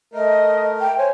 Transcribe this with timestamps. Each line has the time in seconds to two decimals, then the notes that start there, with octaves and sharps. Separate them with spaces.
0.14 A3 A#4 D#5
0.80 G5
0.98 C5 C#5 G#5